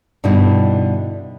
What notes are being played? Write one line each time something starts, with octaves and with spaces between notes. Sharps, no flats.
G2 B2 D3 D#4 E4